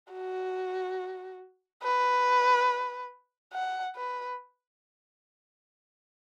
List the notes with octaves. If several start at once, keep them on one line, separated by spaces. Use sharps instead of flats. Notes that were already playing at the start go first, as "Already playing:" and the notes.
F#4
B4
F#5
B4